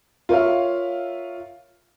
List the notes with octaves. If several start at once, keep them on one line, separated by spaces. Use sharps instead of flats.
F4 A#4 C#5 E5 F5